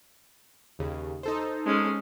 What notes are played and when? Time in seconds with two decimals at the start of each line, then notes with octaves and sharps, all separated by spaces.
0.79 D#2 C#3
1.23 D#4 A4 C5
1.66 G#3 C#4